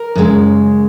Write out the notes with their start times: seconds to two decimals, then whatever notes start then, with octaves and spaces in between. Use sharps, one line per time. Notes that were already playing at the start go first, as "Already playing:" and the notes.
Already playing: A#4
0.15 F#2 C#3 G#3